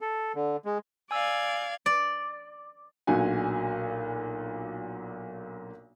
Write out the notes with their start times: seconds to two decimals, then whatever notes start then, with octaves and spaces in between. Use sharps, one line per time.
0.01 A4
0.35 D3
0.65 G#3
1.11 D5 F5 G#5 E6 G#6
1.86 D5
3.07 B1 A#2 D4 F#4 G#5